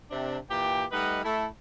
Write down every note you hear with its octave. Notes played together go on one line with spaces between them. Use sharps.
C3 D4
A#2 E3 G4 G5
G3 A3 D#4 B4 D#5 F#5
A3 E4 A4